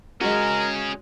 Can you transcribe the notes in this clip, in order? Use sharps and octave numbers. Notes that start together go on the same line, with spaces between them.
G#3 C#4 F#4 G#4 A#4